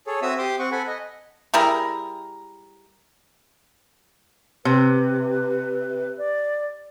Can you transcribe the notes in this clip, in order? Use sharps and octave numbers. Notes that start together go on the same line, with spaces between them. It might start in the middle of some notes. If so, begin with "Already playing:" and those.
G#4 A4 C#5
C4 F#4 E5 D#6 E6
G4 C6 D6 D#6
C4 F#5 C#6
A4 F#5 G#5 B5
D#5
G3 E4 G#4 A#4
C3 B4
D5